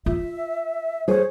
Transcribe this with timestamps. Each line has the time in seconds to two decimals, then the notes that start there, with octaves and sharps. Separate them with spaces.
0.06 F4 E5
1.08 G#4 C5 C#5